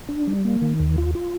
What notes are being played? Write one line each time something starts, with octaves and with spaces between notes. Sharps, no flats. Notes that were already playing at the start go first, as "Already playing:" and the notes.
D4
G3
A#3
D#3
D#2
F4
F4